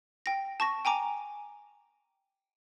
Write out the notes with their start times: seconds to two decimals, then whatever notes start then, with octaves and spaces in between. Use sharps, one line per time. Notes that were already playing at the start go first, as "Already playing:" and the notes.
0.26 G5 A#6
0.60 A5 C#6 A#6
0.85 G5 G#5 A#5 D6